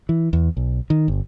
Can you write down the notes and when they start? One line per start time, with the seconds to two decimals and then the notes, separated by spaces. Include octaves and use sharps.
0.09 E3
0.33 E2
0.57 B1
0.90 D#3
1.08 G1